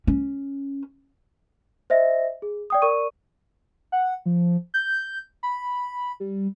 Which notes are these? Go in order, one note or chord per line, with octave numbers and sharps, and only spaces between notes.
C#4
C5 D#5 E5 A#6
G#4
D5 G5 D#6
A#4 D5 C#6 D#7
F#5
F3
G6
B5
G3